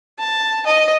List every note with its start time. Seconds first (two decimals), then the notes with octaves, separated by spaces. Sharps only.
0.19 A5
0.66 D#5